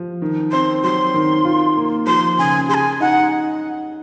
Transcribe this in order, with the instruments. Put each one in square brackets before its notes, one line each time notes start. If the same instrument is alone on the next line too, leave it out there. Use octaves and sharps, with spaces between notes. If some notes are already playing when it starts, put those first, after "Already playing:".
Already playing: [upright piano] F3
D#3
[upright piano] C4 [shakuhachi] C6
[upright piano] F#3 [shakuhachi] C6
[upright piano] D#3
F4
A#3
[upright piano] F3 [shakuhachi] C6
[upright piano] C#3 [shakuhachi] G#5
[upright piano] G#4 [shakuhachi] C6
[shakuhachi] G#5
[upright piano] D#4 [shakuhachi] F#5